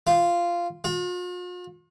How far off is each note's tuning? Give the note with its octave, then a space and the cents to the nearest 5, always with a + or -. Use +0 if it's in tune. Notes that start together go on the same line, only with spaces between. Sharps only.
F4 -10
F4 +45